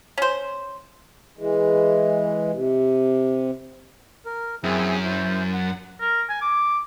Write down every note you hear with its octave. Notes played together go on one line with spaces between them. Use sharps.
C#4 C5
E3 G#3
C3
A#4
F#2 C4 E4 G#4
E4 C5
F#5
A#4
G#5
D6